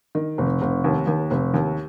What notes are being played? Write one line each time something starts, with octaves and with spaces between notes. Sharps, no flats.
D#3
F1
F1
D#2
D#2
F1
D#2